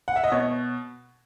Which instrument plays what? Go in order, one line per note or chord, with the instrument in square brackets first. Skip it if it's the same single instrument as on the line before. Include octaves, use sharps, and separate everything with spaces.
[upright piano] F#5
E5
D#5
B2 C#5